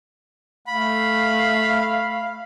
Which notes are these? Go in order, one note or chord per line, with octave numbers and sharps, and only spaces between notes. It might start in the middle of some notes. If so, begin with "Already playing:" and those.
A3 F5 B5